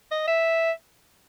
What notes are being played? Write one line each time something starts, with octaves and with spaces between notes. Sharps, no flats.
D#5
E5